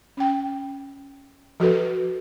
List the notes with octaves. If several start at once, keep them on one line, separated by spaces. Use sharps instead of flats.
C#4 G5
F3 F#4 A4 B4